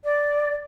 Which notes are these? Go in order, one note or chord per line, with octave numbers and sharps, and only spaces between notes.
D5